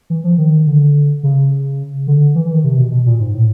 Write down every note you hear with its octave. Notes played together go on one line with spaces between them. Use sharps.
E3
F3
D#3
D3
C#3
D3
E3
E3
D#3
C3
B2
B2
A#2
G#2
A2